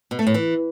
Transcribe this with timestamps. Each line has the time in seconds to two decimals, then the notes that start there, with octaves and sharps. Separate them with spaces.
0.11 B2
0.19 A3
0.27 A2
0.34 E3